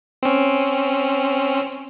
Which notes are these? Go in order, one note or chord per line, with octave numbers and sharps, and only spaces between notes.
C4 C#4